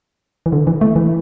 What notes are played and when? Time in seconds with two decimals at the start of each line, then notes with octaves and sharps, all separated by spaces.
0.46 E3
0.52 D3
0.67 E3
0.81 A3
0.96 E3